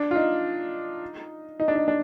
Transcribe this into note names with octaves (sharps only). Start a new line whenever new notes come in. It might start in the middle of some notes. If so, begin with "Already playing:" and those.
Already playing: D4
F4
D#4
D#4
D4
D#4
D4